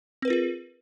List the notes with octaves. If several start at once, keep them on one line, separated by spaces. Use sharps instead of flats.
C4 F4 G#4 A#4 B4